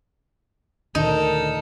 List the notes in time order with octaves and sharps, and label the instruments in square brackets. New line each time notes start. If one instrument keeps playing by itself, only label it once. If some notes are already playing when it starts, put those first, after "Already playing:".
[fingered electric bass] D2 [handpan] A#2 D#3 [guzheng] D#4 [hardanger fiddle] A4 A#4